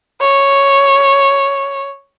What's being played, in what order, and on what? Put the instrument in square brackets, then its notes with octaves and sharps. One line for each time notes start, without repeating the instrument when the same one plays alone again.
[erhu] C#5